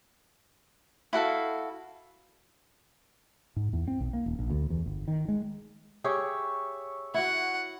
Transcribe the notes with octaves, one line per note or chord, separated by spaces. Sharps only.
E4 F#4 A4 F5
G#2
E2
C4
B1
A#3
D#1
A#1
D2
E2
G1
D#3
G#3
G4 G#4 C#5 E5
E4 F#4 F#5